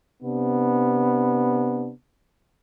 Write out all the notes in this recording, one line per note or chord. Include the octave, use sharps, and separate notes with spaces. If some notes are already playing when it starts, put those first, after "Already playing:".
C3 B3 D4